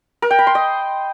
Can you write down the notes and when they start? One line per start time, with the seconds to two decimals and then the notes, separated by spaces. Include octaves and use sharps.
0.22 A#4
0.31 G5
0.39 B5
0.47 C6
0.55 D#5